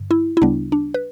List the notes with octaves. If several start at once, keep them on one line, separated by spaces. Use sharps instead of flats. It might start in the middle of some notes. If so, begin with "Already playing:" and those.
Already playing: G2 D3
E4
E4
D2 C#3 G3 B3 D4
D4
B4